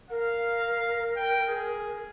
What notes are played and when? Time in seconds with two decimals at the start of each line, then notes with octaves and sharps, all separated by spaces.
0.10 A#4 F5
1.16 G5
1.49 G#4